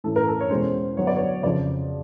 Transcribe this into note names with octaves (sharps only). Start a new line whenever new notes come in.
A2 E3 A3 C#4 A4
A#4
A4
C#5
E2 B2 G#3 C#4 C5
D3 F#3 B3 C#5
D5
C#5
F2 C#3 F3 D5